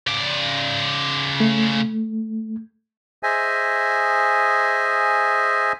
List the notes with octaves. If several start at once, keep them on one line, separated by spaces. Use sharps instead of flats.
C#3 D5
A3
G#4 C5 D#5 E5 G#5